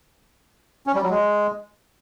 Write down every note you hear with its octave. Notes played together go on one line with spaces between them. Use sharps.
C#4
G3
F#3
G#3